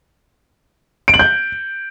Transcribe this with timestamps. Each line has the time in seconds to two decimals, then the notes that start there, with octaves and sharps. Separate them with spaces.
1.08 D7
1.14 F#7
1.19 G6